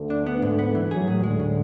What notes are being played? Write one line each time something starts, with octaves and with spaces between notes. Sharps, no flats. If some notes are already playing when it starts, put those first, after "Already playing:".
Already playing: D2 D3
D4
B3
G#2
B3
E3
F#2 F#3 G#4
A2
D2 D3 G#3
A2